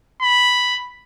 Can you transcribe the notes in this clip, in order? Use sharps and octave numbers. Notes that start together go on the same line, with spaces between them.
B5